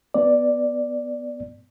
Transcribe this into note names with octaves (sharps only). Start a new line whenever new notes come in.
B3 D5